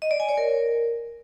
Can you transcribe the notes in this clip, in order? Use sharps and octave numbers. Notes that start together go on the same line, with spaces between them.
D#5
D5
G#5
C#5
A#4